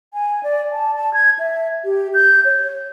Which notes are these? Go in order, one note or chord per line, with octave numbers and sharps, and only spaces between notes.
G#5
D5
A5
A5
G#6
E5
G4
G6
C#5